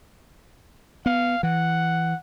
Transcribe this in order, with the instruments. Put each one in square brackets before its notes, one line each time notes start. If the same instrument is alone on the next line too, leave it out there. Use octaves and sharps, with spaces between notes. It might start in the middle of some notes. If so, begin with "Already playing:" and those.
[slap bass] B3 [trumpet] F5
[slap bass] E3 [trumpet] F#5